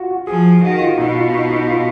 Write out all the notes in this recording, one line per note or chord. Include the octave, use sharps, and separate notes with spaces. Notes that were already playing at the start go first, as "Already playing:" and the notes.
Already playing: F4 F#4
F#4
F3 G#4
D#3 F#4
F4
B2 D#4
F4
D#4
D#4
F4